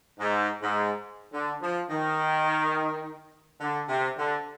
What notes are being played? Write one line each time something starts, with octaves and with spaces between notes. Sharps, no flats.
G#2
G#2
D3
F3
D#3
D3
C3
D3